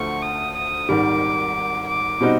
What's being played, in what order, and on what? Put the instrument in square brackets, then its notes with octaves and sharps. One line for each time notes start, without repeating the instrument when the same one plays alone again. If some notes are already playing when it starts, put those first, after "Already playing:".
Already playing: [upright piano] D2 D3 F3 A3 [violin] C#6
[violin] D#6
D#6
[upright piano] G#1 G#2 D#3 G3 [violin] D6
[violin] D6
[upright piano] B2 G3 C4 D#4 F#4